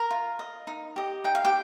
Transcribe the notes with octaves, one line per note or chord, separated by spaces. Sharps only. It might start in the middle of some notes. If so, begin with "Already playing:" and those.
Already playing: A#4 A#5
F4
D#5
D#4
G4 D#5
D#4 G5
F5
G4 G5